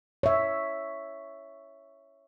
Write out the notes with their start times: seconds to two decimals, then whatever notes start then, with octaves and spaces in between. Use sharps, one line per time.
0.23 C#5 E5